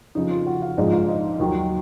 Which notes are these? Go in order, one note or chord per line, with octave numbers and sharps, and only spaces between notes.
F2 C#3 F3 D#4
F4
F#4
F5
A#1 G#2 F3 G#3 D#5
F5
D#5
D#2 D#3 F#3